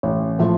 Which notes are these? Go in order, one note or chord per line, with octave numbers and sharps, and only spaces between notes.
A1
A2 F3 A3